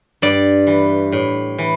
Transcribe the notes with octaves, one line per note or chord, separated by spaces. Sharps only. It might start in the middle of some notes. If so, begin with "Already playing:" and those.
G2 D5
E3
A2
E3